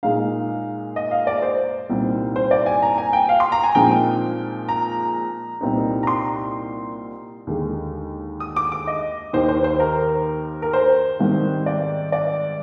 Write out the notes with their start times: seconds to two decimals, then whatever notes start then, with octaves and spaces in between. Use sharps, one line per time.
0.03 A#2 G#3 D#4 F5
0.96 D#5
1.11 F5
1.27 D5
1.42 C5
1.89 C2 A#2 G3 C4 D#4
2.36 C5
2.51 D5
2.66 G#5
2.82 A#5
2.98 G#5
3.13 G5
3.29 F5
3.40 C6
3.52 A#5
3.63 G#5
3.75 A#2 F3 G#3 C4 D#4 G5
4.69 A#5
5.61 C2 A#2 G3 C4 D#4
6.03 A#5
6.07 C6
7.47 D#2 D3 G#3
8.40 D#6
8.56 D6
8.72 D6
8.87 D#5
9.33 D#2 D#3 A#3 C5
9.49 C5
9.64 C5
9.80 A#4
10.62 A#4
10.73 C5
11.19 G#2 D#3 G3 C4
11.66 D5
12.12 D5